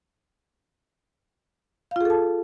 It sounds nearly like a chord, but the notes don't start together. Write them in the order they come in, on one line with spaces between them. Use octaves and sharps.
F5 F4 G#4 A4 A5